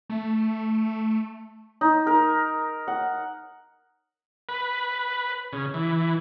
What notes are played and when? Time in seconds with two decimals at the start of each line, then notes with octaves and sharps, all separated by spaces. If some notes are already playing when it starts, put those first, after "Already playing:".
0.10 A3
1.81 D#4
2.07 A#4
2.88 F#5
4.49 B4
5.53 C#3
5.74 E3